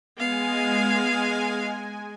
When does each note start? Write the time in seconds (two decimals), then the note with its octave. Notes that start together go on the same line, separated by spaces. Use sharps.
0.16 G#3 B3 F5 G#5